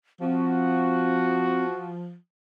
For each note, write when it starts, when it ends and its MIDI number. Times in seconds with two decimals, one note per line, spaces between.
0.21 2.16 53
0.21 1.64 60
0.21 1.95 66